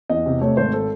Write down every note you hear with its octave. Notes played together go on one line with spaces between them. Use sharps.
E2 D#5
C3
A3 C#5
G#1 C5
A4